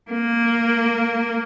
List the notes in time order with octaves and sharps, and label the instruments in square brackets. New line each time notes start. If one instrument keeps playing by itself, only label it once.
[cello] A#3